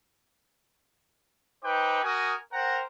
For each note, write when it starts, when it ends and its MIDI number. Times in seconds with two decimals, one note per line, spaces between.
1.64 2.01 63
1.64 2.01 71
1.64 2.01 72
1.64 2.01 79
1.64 2.01 86
2.03 2.34 66
2.03 2.34 70
2.03 2.34 80
2.03 2.34 87
2.52 2.80 70
2.52 2.80 72
2.52 2.80 78
2.52 2.80 79
2.52 2.80 82